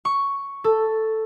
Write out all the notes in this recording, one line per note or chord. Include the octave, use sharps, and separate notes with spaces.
C#6
A4